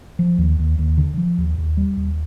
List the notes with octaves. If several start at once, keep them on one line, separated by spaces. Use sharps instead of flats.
F3
D#2
D#2
D#2
D3
F3
D#2
D#2
G3
D#2